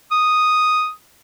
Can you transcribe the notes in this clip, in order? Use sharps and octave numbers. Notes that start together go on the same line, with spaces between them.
D#6